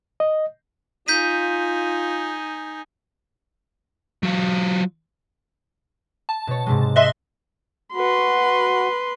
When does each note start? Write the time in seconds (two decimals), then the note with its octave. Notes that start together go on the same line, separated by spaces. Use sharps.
0.20 D#5
1.08 D#4 F4 G#5 G6 B6 D#7
4.23 F#3 F4
6.29 A5
6.47 B2 C#5
6.66 G#2 C3 G#3
6.96 D#5 E5 C6 F#6 A#6
7.94 F#4 B4 C6